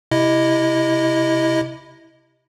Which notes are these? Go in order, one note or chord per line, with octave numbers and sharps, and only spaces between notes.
C3 E4 D#5